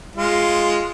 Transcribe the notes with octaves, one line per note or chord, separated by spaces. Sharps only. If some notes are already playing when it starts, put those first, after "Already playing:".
G#3 F4